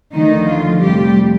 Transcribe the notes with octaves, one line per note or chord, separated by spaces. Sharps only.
D2 D3 D#3 F3 A3 D#4
F3 F4
F2 C3 F3 G3 A3 G4